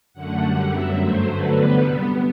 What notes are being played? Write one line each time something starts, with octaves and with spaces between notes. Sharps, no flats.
F#2 D3 A3 F#5
F#2 D3 G3 F#5
F#2 F#3 B3 E5
G2 F#3 A3 C5
G2 D3 F#3 A3 B4
E2 D3 G3 B3 B4
C3 G3 B3